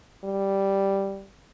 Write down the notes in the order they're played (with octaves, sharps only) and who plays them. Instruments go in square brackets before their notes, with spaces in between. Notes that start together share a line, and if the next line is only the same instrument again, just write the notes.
[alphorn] G3